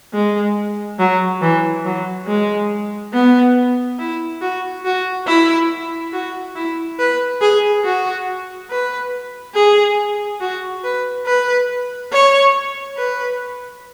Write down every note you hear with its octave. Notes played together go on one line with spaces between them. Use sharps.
G#3
F#3
E3
F#3
G#3
B3
E4
F#4
F#4
E4
F#4
E4
B4
G#4
F#4
B4
G#4
F#4
B4
B4
C#5
B4